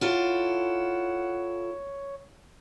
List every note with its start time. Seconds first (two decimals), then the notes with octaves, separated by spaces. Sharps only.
0.01 E4 F4 A4 C#5 F#5